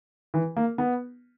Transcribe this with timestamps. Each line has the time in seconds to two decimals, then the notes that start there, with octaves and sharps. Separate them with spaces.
0.34 E3
0.57 A#3
0.78 B3